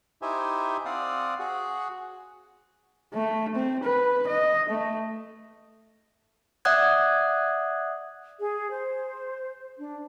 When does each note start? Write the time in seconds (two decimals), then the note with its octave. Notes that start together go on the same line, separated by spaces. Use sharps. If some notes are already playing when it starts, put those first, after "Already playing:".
0.22 D#4 E4 G4 C5 E5 G#5
0.85 C4 D5 F5 F#5 D#6
1.39 F#4 G#4 F#5
3.14 A3
3.55 C4
3.84 B4
4.27 D#5
4.69 A3
6.65 D5 E5 F#5 D#6 F#6 G#6
8.40 G#4
8.71 C5
9.78 D4